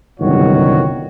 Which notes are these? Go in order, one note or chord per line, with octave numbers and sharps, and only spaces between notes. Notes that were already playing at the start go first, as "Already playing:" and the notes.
G1 C2 F#2 D#3 F#4 C#5